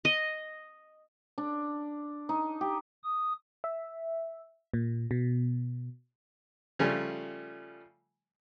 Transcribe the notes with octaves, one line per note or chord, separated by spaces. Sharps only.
D#5
D4
D#4
G4
D#6
E5
A#2
B2
C#3 F3 G3 A3 G#5